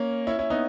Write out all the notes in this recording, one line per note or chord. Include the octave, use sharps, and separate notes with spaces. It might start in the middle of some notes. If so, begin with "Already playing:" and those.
Already playing: A#3 C#4
C#4 E4
C#4 E4
B3 D#4